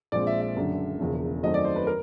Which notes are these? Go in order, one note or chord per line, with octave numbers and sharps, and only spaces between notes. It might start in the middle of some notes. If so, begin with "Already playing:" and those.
A#1 A#2 F3 G#3 C4 D5
E5
E5
F#1 F#2 D3
E1 E2 C#3 F3
F#2 D#3 F#3 A3 C4 D#5
D5
C5
B4
A#4